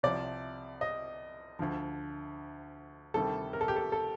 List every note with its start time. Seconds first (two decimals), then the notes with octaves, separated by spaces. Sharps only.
0.03 C2 C3 F3 D5
0.81 D#5
1.59 D2 D3 F3
3.14 D2 C3 D#3 G3 A4
3.53 A#4
3.61 A4
3.68 G4
3.76 A4
3.92 A4